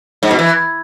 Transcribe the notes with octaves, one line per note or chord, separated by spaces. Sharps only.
G#2
B2
E3